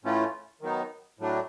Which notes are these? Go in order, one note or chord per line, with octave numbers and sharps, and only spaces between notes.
A2 E3 A3 C#4 F4
D#3 F#3 B3 D#4
A2 F#3 A3 D4